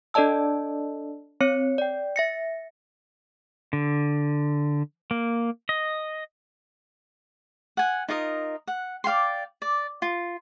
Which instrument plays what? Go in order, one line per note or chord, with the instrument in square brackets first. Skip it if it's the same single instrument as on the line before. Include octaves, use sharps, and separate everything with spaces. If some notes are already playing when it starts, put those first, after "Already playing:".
[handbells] D4 A4 D5 D#5 A5 E6
C4 C#5 C#7
D5 G5
E5 A#6 C#7
[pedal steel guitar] D3
A#3
D#5
[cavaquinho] F#5 G#5
D#4 F4 A#4 D#5
F#5
D5 F5 G5 C6
D5
F4